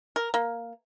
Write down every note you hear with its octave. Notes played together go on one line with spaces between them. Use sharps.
A#4
A#3